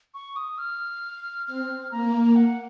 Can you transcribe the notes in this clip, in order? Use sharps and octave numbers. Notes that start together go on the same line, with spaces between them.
C#6
D#6
F6
C4 F6
A#3 A#5
F#5